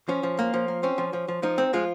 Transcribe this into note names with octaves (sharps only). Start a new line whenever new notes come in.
F3 C#4
F3
A#3
F3
A#3
C4 C#4
F3
F3
F3
F3 D#4
C4
F3 G#3 F4